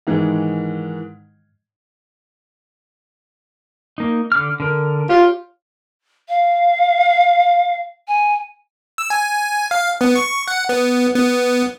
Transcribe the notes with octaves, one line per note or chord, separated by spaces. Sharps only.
G#2 D#3 E3 G#3
A#3 D#4
D3 D6 F6
D3 A#4
F4 G4 C#5
F5
G#5
E6
G#5
F5
B3
C#6
F#5
B3
B3